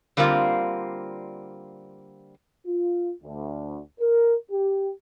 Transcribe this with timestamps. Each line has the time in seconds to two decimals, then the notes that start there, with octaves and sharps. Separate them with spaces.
0.17 D3 G3 A#3 C4 F4
2.67 F4
3.22 D2
4.00 A#4
4.51 G4